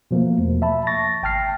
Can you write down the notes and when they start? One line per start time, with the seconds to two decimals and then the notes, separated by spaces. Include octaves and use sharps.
0.11 B2 F3 A3 A#3
0.38 E2
0.62 E5 A5 B5
0.87 C#6 A6 A#6
1.23 G#1 G5 A5 F6 C7